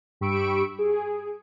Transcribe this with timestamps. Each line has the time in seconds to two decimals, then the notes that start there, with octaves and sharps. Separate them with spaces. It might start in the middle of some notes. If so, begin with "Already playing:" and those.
0.21 G2 G4 B5 C#6 E6 D7
0.79 G#4